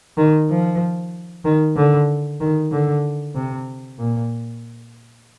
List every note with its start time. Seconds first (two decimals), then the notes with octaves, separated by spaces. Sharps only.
0.17 D#3
0.50 F3
1.45 D#3
1.76 D3
2.41 D#3
2.72 D3
3.35 C3
3.99 A#2